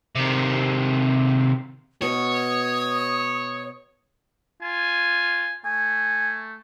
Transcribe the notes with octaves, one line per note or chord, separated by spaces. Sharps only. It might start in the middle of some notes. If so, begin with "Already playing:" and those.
C3 D#3
B2 C#5 D#6
F4 G#5
A3 G#5